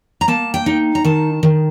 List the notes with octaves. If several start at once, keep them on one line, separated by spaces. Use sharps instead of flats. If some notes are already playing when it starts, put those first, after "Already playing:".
A#5
A#3 A5
G5
D#4
A#5
D#3 A5
D#3